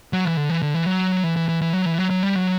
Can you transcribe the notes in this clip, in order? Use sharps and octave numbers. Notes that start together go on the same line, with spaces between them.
F#3
E3
D3
E3
D3
E3
F#3
E3
E3
E3
E3
F#3
E3
F#3
F#3
G3
F#3